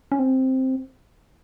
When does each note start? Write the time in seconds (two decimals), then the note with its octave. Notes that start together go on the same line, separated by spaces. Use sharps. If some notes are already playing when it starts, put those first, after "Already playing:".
0.12 C#4
0.19 C4